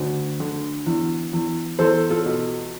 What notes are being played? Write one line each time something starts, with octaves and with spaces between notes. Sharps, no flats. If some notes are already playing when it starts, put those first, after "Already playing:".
Already playing: D2
D3
E2
E2
E2 A4 C5
F4 A4
B2